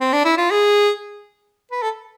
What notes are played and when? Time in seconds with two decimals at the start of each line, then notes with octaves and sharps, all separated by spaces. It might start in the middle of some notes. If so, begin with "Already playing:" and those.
0.01 C4
0.13 D4
0.25 E4
0.37 F4
0.50 G#4
1.72 B4
1.82 A4